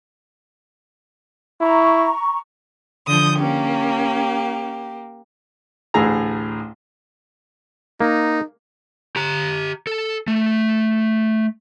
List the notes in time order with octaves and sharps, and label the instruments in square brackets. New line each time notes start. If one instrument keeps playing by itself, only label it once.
[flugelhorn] E4 [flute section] A#5 C#6
[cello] D3 F3 [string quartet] D#6 G6
[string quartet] A#3 G4 [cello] C#4
[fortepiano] A1 D2 A2 G#4 A#5
[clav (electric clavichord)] A#3 [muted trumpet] D#4
[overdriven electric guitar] G4 A#5
A4
A3